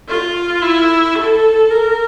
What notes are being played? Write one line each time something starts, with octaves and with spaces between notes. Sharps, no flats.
F4
E4
A4
A#4